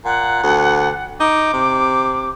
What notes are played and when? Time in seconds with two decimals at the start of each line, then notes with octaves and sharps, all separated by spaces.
0.05 A#2 F#5
0.43 D2
1.20 D#4 D6
1.53 C3